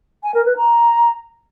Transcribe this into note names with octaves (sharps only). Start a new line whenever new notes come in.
G#5
A#4
B4
A#5